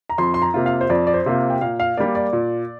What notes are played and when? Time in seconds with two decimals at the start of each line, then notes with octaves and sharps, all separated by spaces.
0.10 A#5
0.18 F2 C6
0.34 C6
0.42 A#5
0.54 C3 A#3 F4
0.66 F5
0.81 C5
0.90 F2 D5
1.07 D5
1.14 C5
1.26 C3 A#3 F4
1.50 G5
1.61 A#2 F5
1.80 F5
1.97 G3 A#3 D5
2.15 D5
2.33 A#2